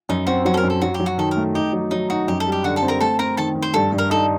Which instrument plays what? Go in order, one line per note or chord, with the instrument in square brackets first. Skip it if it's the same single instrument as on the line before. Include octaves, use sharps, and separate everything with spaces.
[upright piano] F#2 [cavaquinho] D#4
[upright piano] C4 [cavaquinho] F#4
[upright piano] F#3 [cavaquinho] F#4
[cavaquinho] A4
A#4
[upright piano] F#2
[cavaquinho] A4
[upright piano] F#3 [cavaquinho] F#4
[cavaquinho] G4
[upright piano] F#3
[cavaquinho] F#4
[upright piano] D#3 [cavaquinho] A4
[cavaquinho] A#4
[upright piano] A3
[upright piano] D#4 [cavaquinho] G4
[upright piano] F#3
[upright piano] F#3 [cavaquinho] D#4
[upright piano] D#4 [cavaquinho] F#4
[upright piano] F#2 [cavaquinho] G4
[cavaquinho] A4
[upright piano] G3
[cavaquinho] G4
[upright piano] D3 [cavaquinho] F#4 F#5
[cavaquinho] A4 A5
[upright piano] C4
[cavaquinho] A#4 A#5
[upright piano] A3 [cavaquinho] A4 A5
[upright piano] C4 [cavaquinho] A#4 A#5
[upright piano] D#3 [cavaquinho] A4 A5
[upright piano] D#3
[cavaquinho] C5
[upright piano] G2 [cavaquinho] A4
[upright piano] G2
[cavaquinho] A#4
[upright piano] D#4 [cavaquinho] A4